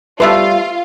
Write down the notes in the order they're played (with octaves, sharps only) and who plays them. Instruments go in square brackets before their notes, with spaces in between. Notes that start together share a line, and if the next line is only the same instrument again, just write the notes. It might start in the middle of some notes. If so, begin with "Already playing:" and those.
[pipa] F3 A3 C6 [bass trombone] G3 [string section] F4 F5 [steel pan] B4 E5